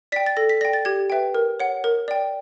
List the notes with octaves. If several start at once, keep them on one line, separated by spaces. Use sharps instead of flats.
D5 G5 B6
A6
A4 A#6
B6
D5 G5 A#6
A6
G4 G#6
B4 E5 G5
A#4
C#5 F#5
A#4
D5 G5